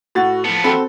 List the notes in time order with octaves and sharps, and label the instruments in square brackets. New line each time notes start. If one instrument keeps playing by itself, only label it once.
[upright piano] A2 A6 [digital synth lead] F#4
[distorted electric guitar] F3 B3 [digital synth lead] A5
[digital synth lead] C4 [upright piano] F#4 A4 B5